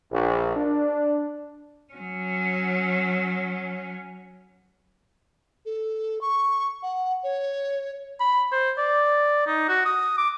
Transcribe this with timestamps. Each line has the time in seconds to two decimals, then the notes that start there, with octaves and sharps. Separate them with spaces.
0.11 A#1
0.55 D4
1.94 F#3 C#4
5.66 A4
6.21 C#6
6.83 F#5
7.24 C#5
8.20 B5
8.52 C5
8.78 D5
9.47 D#4
9.69 F#4
9.85 D#6
10.17 D6